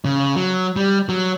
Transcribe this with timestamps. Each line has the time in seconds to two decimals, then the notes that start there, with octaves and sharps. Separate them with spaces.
0.05 C#3
0.36 F#3
0.76 G3
1.09 F#3